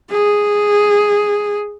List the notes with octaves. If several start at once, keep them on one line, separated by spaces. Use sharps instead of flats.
G#4